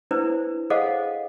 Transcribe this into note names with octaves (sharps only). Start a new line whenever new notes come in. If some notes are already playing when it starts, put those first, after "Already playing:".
D4 E4 B4 C5
G#4 A4 C5 D#5 F5 F#5